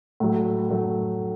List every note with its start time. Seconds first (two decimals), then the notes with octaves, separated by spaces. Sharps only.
0.20 A2 F#3 A3
0.69 A2 F#3 A3